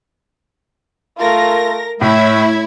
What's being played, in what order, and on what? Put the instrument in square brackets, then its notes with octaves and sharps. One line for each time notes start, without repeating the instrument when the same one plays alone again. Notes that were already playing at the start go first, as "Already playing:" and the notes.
[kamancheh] A3 F4 [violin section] A#4 A#6
[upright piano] A2 [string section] A3 E4 C#5 [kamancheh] E5 [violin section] B5 G#6